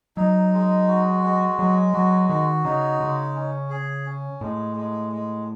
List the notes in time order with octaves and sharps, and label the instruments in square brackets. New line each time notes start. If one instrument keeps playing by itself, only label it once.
[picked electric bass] F#3 [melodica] D#4
[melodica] G#3
F#4
G#3
[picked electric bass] F#3 [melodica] G#3
[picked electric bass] F#3 [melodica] F#4
[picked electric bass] D#3 [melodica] F#4
[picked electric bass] C#3 [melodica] D#4
[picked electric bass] C#3 [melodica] G#3
[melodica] C#4
G#4
C#4
[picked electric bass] A2 [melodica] G#3
[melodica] G#3
G#3